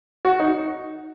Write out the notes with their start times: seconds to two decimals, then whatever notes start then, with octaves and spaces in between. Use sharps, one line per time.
0.25 F#4
0.40 D#4